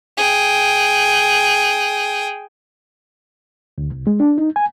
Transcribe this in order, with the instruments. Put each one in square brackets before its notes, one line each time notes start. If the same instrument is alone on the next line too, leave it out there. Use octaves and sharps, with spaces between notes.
[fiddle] G#4 G5
[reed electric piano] D2
C2
G#3
D4
D#4
G#5